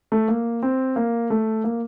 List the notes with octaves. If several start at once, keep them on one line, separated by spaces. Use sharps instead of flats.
A3
A#3
C4
A#3
A3
A#3